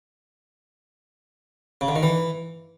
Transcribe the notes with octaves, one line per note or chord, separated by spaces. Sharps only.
C#3
D3
D#3
E3